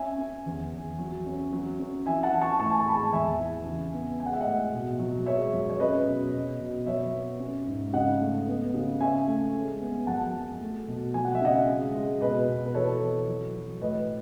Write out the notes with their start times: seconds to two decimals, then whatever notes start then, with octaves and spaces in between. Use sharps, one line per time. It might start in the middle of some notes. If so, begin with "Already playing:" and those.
Already playing: C#4 E5 G#5
0.18 C#4
0.46 E2
0.72 E2
0.99 F#3
1.26 C#4
1.52 F#3
1.79 C#4
2.06 E3 E5 G#5
2.23 F#5 A5
2.33 E3
2.41 A5 C#6
2.59 A2 A5 C#6
2.71 G#5
2.79 A5
2.86 G#3 B5
2.94 A5 C#6
3.13 E2 E5 G#5
3.39 E3
3.66 C#3
3.93 B3
4.20 G#3 G#5
4.26 F#5
4.33 E5
4.41 A2 D#5 F#5
4.72 B2
4.99 F#3
5.26 G#3 C#5 E5
5.52 F#2
5.69 C#5
5.80 C#4 B4 D#5
6.07 B2
6.33 B2
6.60 B2
6.86 F#2 C#5 E5
7.13 B3
7.40 C#4
7.67 G#2
7.93 C#3 D#5 F#5
8.20 A3
8.47 B3
8.74 C#3
9.00 C#4 E5 G#5
9.27 A3
9.53 G#3
9.80 B3
10.07 F#2 F#5 A5
10.33 F#3
10.61 A3
10.88 B2
11.14 F#3 G#5
11.25 F#5
11.35 E5
11.41 C#3 D#5 F#5
11.68 G#3
11.95 G#3
12.21 B2 B4 D#5
12.48 B2
12.66 B4
12.75 E3 A4 C#5
13.01 E3
13.27 F#3
13.54 F#3
13.81 A2 B4 D#5